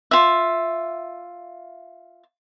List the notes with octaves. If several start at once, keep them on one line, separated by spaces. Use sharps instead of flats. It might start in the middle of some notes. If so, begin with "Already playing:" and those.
F4 E5